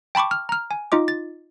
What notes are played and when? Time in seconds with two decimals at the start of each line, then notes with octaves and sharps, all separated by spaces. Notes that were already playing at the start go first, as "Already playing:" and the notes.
0.15 G5 A5 B5 C#6 D6
0.31 F6
0.49 A#5 F6
0.71 G#5
0.92 D#4 F4 D#5 D6
1.08 A6